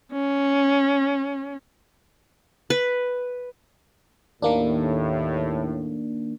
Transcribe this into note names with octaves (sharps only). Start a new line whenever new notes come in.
C#4
B4
D#2 A2 D#3 A#3 D4